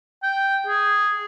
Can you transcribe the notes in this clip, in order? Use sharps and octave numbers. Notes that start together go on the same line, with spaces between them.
G5
G#4